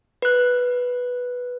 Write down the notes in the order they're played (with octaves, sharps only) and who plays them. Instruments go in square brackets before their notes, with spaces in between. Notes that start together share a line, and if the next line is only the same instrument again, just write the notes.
[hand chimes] B4 F#6